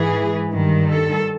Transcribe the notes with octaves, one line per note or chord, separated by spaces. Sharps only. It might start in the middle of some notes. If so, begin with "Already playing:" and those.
Already playing: G#2 E3 G#4
G2 D#3
A4